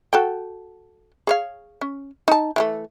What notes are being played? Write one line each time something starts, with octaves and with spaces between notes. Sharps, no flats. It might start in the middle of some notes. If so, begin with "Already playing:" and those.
F#4 A4 G5
G#4 C#5 F5
C#4
D#4 A5
E3 G#3 A3